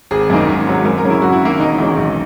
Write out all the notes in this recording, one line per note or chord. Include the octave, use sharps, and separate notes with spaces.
G#1 G#4
F#2 D#3 A#3 D#4
G#1
G#2 F#3
F#2 A#4
A#4
C#3 F#3 C#4
E4
F#2 F#4
E4
D#3 A#3
E1 D#4
E2 D#3 G#3 C#4
B1